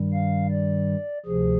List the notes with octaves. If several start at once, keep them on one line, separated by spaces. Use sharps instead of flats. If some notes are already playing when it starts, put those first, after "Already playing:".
Already playing: G2 D#3 G3
F5
D5
D2 C3 F3 G#4